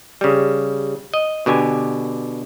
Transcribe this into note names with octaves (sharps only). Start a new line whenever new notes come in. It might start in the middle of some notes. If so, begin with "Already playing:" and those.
C#3 G3
D#5
B2 D3 G4 G#5